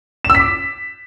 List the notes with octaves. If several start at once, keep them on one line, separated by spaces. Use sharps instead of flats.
E7
E6
B6
D6